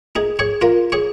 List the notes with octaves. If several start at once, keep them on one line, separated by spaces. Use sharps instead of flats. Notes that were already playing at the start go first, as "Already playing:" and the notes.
D#4 G#4
G#4 C#5
F4 A#4
G#4 C#5